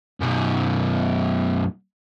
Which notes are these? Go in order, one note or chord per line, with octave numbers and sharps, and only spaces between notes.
F#2 B2